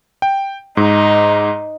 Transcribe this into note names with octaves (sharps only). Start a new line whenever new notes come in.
G5
G#2 D#4